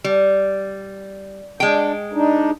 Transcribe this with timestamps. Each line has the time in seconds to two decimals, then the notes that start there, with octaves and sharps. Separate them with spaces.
0.04 G3
1.60 G#3 D4 G5
2.13 D4 D#4